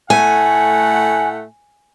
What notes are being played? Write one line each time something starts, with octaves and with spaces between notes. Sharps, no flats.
A2 A3 F#5 G#5